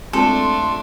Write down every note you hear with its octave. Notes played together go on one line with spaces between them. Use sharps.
G#3 A3 C4 D4 F4 A4 C6